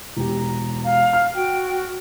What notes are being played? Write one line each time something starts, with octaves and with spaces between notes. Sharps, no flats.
E1 G4 A#5
F5
F6
F#4 G5